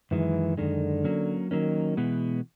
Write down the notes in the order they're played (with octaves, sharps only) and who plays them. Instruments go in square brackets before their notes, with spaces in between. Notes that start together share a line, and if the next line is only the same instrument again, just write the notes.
[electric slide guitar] F#2 D#3 G#3 [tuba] E3
[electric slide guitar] F#2 D#3 G#3 [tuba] D3
[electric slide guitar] F#3 A#3 C#4
[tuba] D#3 [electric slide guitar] F#3 A#3 C#4
[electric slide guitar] B2 G#3 B3 [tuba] E3